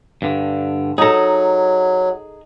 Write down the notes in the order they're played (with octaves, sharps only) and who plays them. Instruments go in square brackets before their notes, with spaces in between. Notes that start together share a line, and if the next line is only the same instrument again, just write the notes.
[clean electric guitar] G2 D3
[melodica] F#3 [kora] D#4 A4 [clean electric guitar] G#4 A#5